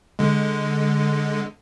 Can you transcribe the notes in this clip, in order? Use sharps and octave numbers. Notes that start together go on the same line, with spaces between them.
D3 G#3